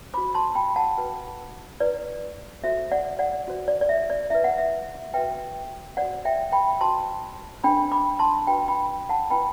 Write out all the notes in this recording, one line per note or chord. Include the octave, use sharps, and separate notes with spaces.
F#4 C5 B5 D6
A5 C6
G5 B5
F#5 A5
F#4 B4
E4 B4 D5
F#4 A4 C5 E5
D5 F#5
D5 F#5
F#4 C5
D5
D5
E5
D5
E4 B4 E5
F#5
E5
F#4 B4 E5 G5
F#4 C5 D5 F#5
E5 G5
G5 B5
F#4 C5 A5 C6
D4 A4 C5 G5 B5
B5 D6
A5 C6
D4 F#4 B4 G5 B5
G5 B5
F#5 A5
E4 B4 G5 B5